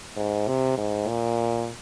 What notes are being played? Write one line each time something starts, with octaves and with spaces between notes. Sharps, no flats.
G#2
C3
G#2
A#2